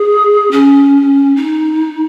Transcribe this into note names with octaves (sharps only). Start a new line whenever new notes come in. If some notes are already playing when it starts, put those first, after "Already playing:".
Already playing: G#4
C#4
D#4